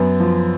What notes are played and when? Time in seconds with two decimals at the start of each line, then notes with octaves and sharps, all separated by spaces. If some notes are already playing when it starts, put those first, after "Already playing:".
Already playing: F#2 B3
0.20 F3